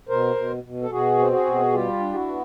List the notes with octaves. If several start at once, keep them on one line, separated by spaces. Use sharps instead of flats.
B2 A#4 C5
B2
B2
A4
B2 F#4 G#4
C4
F#4 G#4
B2
G3 F4 G4
D4
E4 F#4
B3